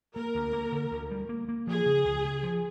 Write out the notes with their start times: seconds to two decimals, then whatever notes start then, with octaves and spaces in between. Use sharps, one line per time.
0.15 A#3 A#4
0.35 D2
0.53 A#3
0.72 D3
0.91 D2
1.11 G3
1.29 A#3
1.49 A#3
1.67 F3 G#4
1.86 C#3
2.05 C#2
2.25 C#3
2.43 F3